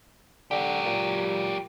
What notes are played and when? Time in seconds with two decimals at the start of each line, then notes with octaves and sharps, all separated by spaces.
0.51 D3 F#3 G4
0.86 A#2